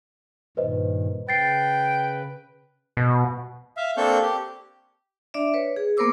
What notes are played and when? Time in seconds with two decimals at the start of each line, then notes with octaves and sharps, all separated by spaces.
0.57 G2 A#2 D#3 B4 C5 D#5
1.29 C#3 B4 G5 A6 C7
2.97 B2
3.77 E5 F5
3.97 A#3 C4 D4 A4 C#6 G6
4.22 G4
5.34 D4 D5 E5
5.54 B4 C#5
5.76 G#4
5.97 A#3 B3 A#4 C5 D6 E6